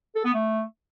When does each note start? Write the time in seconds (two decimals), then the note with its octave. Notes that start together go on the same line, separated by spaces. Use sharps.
0.15 A4
0.25 B3
0.34 A3